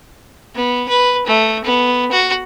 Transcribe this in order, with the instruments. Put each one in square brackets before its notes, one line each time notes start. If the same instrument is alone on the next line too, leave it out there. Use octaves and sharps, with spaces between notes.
[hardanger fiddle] B3
B4
A3
B3
F#4